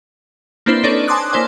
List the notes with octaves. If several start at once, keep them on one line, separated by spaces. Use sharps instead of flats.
A#3 C4 D4 E4 B4 C5
D4 D#4 A4 B4 C#5 D5
G#5 A5 C6 D6 D#6 F#6
A#3 E4 C5 D5 G#5